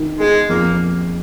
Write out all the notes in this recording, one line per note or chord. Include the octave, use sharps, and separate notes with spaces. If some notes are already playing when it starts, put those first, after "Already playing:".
Already playing: D#3
G#3 G#4
F2 A#3